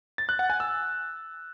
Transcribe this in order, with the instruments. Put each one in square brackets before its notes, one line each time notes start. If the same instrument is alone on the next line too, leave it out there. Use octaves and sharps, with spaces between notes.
[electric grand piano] A6
F#6
F#5
G#5
E6